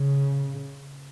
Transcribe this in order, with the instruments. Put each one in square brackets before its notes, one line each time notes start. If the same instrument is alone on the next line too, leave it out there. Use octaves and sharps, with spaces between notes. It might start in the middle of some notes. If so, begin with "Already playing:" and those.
Already playing: [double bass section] C#3